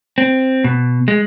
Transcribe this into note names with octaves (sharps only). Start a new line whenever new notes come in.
C4
B2
G#3